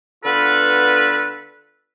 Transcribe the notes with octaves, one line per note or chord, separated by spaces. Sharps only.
D3 B3 F4 A4 B4